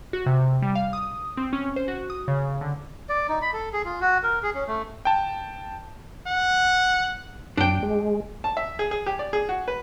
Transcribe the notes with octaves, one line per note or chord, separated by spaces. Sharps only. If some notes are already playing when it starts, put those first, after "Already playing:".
F#4
C3
G3
F5
D#6
C4
C#4
C5
F#4
D#6
C#3
D3
D5
D#4
B5
A4
G#4
F4
F#4
A#4
G#4
C#4
A3
G5 A5
F#5
F#2 D4 G5
G#3
A5
E5
G#4
G#4
G4
D5
G#4
F#4
B4